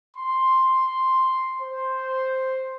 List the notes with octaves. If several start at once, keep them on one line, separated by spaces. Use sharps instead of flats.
C6
C5